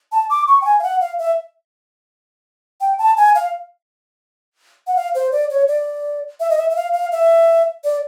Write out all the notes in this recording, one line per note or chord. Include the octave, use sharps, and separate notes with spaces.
A5
D6
C#6
G5
G#5
F5
F#5
F5
E5
G5
A5
G#5
F5
F#5
F5
C5
D5
C#5
D5
E5
D#5
E5
E5
F5
F5
E5
D5